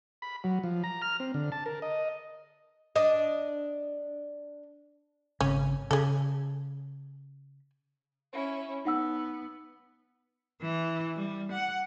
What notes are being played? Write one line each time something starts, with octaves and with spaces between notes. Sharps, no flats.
B5
F#3
F3
A#5
F6
C4
D3
A5
A#4
D#5
D4 D#5
G#1 C#3 C#4
C#3 G#4 A4
C#4 E4
B3 D#4 F#5 E6
E3
G3
F#5